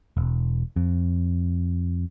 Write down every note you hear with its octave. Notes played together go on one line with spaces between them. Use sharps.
E1
F2